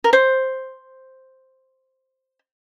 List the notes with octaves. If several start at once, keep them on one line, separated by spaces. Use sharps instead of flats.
A#4
C5